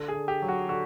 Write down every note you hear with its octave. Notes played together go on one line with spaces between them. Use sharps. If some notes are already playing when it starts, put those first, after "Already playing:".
Already playing: D3
G#4
D3
G4
F#3
F#4
D3 F#4